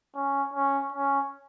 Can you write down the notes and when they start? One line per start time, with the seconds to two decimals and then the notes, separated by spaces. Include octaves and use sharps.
0.15 C#4
0.54 C#4
0.92 C#4